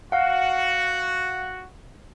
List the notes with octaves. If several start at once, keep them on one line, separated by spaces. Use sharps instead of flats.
F#4 F5 F#5